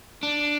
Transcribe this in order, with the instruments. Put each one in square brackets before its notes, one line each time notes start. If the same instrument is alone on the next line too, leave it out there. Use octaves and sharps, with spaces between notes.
[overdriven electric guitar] D4